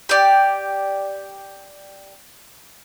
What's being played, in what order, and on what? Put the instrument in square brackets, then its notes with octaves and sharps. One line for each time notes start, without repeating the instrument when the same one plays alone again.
[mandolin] G4 D5